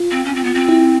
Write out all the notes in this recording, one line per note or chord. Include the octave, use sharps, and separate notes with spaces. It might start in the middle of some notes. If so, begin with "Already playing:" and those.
Already playing: F4
C4
C#4
C4
B3
C4
E4